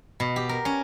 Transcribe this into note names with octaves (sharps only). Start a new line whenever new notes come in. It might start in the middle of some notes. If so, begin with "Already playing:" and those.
B2
G4
A#4
C#4